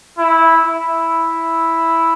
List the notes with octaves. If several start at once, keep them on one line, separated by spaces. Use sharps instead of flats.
E4
E4